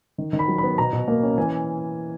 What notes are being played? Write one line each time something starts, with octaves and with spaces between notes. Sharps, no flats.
D#3
D#3
B5
F#3
B5
B3
B2 A#5
B2
A#3
C#4
E3 G#5